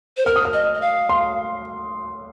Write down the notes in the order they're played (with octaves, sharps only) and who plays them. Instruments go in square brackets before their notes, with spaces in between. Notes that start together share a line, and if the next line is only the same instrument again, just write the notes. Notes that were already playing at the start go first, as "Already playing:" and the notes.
[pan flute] C5
[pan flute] A#4 [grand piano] F6
[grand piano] D#6
F6
[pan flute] D#5
D#5
F5
[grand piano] C6